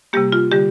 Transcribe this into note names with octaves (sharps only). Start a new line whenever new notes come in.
C3 G3 A#3 G4
F4
D3 G3 G4